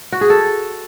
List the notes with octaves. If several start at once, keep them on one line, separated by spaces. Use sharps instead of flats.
F#4
G#4
A4